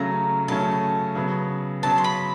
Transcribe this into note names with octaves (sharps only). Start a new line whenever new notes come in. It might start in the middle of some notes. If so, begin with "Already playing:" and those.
Already playing: C#3 F#3 A3 C#4 A#5
C#3 F#3 A3 C#4 A5
C#3 F#3 B3
C#3 F#3 B3 A5
C6
B5